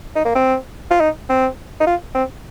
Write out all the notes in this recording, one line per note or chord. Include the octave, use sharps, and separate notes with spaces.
D#4
A#3
C4
F4
D#4
C4
D#4
F4
C4